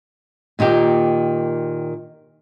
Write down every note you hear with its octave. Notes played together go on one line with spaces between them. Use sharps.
A#2 D#3 A#3 G4